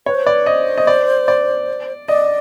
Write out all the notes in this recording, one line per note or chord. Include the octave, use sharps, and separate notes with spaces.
B4 C#5
C5
B4 D5
C5 D#5
D#5
D5
D5
D5 D#5